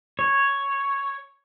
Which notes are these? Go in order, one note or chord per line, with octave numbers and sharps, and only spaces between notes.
C#5